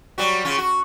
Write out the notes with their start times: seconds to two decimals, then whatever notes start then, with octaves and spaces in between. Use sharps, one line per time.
0.18 F#3 G3 F#4
0.45 C#3 C#4 F4
0.58 F#4